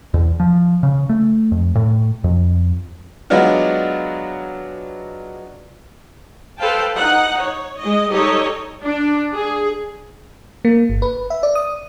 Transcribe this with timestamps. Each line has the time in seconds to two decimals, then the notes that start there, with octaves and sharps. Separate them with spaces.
0.14 E2
0.40 F3
0.83 C#3
1.09 A3
1.52 F2
1.75 A2
2.24 F2
3.30 F#3 G#3 B3 D4 F4 F#4
6.58 A4 B4 C5 F5 G5 A5
6.95 D#4 F#5
7.40 C#5
7.79 G#3 D#5
8.10 G3 D#4 G4 A4 C#5 D#5
8.82 D4
9.34 G#4
10.65 A#3
10.90 G1
11.02 B4
11.30 E5
11.43 D5
11.55 D#6